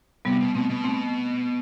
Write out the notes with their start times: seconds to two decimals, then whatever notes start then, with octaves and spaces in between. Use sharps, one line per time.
0.25 C3 G3 B3
0.40 B2
0.55 B2 A3 C4
0.70 B2
0.84 A3 C4